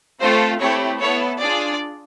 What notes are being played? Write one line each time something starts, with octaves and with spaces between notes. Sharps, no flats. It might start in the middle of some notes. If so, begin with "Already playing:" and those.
A3 C4 F4 A4 C5
A3 C4 E4 G4 C#5
B3 E4 A4 C#5
D4 F4 G#4 D5